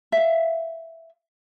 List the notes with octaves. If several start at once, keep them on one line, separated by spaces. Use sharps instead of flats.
E5 F5